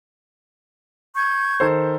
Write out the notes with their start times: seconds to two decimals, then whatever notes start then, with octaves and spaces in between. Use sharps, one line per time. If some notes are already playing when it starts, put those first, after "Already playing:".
1.15 C#6 G6 G#6
1.60 D#3 A4 C5